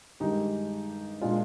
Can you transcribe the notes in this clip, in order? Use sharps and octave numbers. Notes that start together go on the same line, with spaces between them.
G2 D#3 G#3 D#4 G4
A#2 G#3 D4 F4